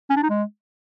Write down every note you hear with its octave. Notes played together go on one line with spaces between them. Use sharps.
C#4
D4
D#4
G#3